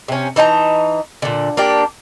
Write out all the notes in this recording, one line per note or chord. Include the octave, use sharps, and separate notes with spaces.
C3 C#4
E3 D#4 A5 A#5
A#2 D3
A#3 D4 G4